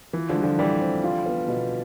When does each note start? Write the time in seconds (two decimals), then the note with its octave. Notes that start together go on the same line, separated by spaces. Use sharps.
0.13 E3 F4
0.29 D3 F3
0.36 G3
0.43 D3 F3
0.58 A2 E3 G3
0.81 C4
1.04 F4
1.26 B3
1.48 B2